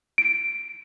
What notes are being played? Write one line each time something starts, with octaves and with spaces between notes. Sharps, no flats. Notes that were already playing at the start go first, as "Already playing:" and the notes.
D7